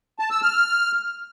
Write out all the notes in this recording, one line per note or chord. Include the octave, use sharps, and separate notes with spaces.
A5
E6
F6